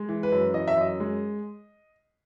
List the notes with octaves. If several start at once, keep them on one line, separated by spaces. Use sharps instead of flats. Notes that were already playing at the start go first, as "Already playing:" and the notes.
Already playing: G#3
E3
B4
F#2
E3 D#5
E5
F#2 D#5
G#3